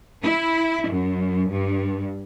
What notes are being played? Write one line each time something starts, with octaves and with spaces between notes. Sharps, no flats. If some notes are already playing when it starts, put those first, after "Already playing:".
E4
F#2
G2